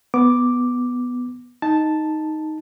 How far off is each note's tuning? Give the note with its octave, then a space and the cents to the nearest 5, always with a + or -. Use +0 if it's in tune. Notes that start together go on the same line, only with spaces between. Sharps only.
B3 +0 D6 +0
D#4 +5 A5 +0